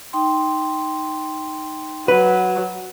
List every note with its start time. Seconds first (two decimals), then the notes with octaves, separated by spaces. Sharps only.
0.13 D#4 G5 C6
2.08 F#3 B4